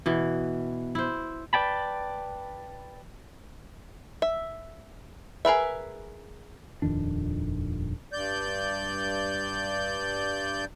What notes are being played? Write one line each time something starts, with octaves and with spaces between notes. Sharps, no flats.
B2 E3
E4 C5
B4 D5 G5 A5 B5
E5
G#4 A#4 B4 E5
D#1 F2 D#3 D4
G2 D5 G6